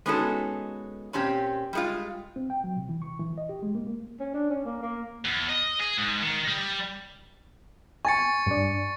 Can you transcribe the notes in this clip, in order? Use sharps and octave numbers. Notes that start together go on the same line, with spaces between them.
G#3 B3 C#4 D#4 F#4 A4
A#2 C4 C#4 G4
G3 G#3 F4
C4
G5
F#3
C3
E3
C#6
E3
D#5
G4
G#3
A#3
A#3
C#4
D4
C#4
A#3
A#3
E2
D#5
G#4
G#2
D#3
G3
G#5 C#6 A6 C#7
G2 D4